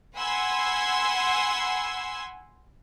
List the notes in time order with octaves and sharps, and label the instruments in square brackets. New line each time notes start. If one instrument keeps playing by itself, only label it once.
[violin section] F#5 G#5 B5 C6 E6 G#6